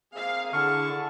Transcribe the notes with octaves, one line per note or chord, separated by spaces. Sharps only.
A#3 C4 G#4 F5
D3 E4 G#4 A5 C#6 F6